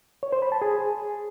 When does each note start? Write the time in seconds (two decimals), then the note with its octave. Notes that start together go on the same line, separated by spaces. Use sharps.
0.23 C#5
0.32 C5
0.42 B5
0.52 A5
0.62 G#4